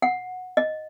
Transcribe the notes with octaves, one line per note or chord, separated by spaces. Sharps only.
F#5
D#5